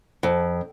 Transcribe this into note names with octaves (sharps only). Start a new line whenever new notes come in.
F2